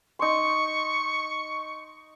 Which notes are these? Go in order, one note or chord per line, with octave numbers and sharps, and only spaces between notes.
D#4 C6 C#6